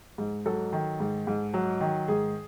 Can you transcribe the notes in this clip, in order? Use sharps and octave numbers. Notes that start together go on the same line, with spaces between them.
G#2
F#3 A4
D#3
G#2
G#2
F#3
D#3
G#2 G#4